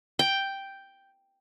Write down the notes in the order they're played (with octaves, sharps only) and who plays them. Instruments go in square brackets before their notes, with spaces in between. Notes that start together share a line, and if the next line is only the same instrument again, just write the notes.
[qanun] G5